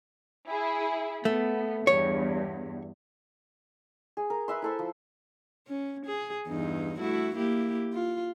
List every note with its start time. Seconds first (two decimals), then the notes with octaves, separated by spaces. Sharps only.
0.48 E4 G#4
1.25 A3 B3
1.87 E2 G2 C#5
4.17 G#4
4.30 A#4
4.48 B4 E5 C6
4.62 E4 A4 C5
4.79 F3
5.68 C#4
6.06 G#4
6.48 E2 G2 D#4
6.99 A3 E4 F#4
7.35 A#3 E4 G4
7.93 F4